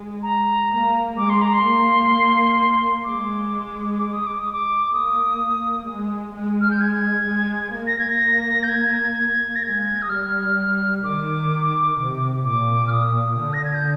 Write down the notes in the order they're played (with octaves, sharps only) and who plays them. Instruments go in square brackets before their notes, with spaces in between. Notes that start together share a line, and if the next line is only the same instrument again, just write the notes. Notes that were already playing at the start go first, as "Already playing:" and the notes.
Already playing: [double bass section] G#3
[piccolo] A#5
[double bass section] A#3
[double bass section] G#3 [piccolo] D6
[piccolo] C6
A#5
C6
[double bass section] A#3
[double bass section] G#3 [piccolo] D6
[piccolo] D6
D#6
D6
D#6
D6
[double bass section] A#3 [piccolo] D#6
[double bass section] G#3
G#3
[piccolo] F6
G6
G#6
[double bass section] G#3
A#3
[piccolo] A#6
G#6
A#6
G6
G#6
A#6
[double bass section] G#3 [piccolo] G#6
[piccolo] D#6
[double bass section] G3 [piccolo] F6
[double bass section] D#3 [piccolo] D6
[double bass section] C3
[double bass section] A#2 [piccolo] D6
[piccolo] F6
D#6
[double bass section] D3
[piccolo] A#6
G#6
G6